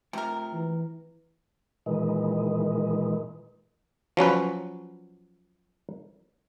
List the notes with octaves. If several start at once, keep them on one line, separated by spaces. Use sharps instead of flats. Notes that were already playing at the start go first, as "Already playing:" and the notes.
C3 A3 F4 G4 A#4
E3
A#2 D#3 E3 G#3
F3 F#3 C#4 B4